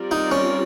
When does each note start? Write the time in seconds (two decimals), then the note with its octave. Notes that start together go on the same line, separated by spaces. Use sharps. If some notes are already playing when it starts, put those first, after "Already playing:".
Already playing: G3 C4 F4 A#4 D5
0.11 D#4
0.31 C#4